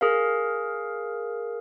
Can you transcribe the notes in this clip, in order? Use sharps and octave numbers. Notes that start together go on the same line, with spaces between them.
G#4 A#4 F5